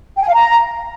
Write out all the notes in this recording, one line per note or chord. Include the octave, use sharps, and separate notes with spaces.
G5
G#5
F5
A#5